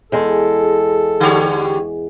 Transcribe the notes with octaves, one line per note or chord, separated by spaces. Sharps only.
E2 G#3 A4
D3 G4 C#5